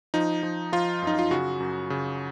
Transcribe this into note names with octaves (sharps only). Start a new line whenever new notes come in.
F3 D#4
F3
F3 F4
F#2 D#4
F4
C#3 F#4
F#2
C#3